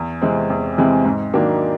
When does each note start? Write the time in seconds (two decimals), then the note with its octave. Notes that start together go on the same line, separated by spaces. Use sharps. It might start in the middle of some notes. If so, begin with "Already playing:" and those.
Already playing: E2
0.22 C3 E3 G#3 C4
0.50 E2
0.77 C3 E3 G#3 C4
1.05 G#2
1.33 D#3 F#3 A#3 D4